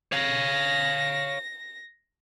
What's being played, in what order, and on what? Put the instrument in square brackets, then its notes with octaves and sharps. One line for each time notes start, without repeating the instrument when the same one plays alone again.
[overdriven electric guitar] C#5 F5 [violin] A#6